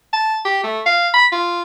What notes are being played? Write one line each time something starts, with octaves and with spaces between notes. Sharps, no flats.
A5
G4
A3
F5
B5
F4